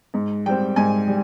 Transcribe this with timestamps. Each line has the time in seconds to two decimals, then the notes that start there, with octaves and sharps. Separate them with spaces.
0.14 G#2
0.46 G3 C4 G5
0.76 G#2 G#5
1.07 G3